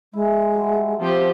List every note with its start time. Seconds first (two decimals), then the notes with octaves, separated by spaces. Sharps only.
0.13 G#3 E4
0.54 F#3 G3 A3
1.00 F3 C4 G4